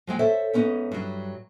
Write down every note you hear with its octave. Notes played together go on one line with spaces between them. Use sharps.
F3 F#3 G#3 G5
A4 C5 C#5 E5
G#2 B3 C#4 D#4
G2 F#3